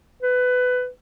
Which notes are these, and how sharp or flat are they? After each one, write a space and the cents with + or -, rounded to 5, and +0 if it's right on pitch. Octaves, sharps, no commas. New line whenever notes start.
B4 +20